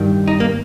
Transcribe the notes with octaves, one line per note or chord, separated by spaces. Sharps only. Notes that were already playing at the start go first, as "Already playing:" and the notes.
Already playing: G2 D#3
D#4
A#3